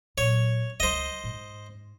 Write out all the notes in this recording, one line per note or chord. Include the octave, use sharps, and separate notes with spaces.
A#2 F#3 C#5
C#2 G3 C5 D#5
G#2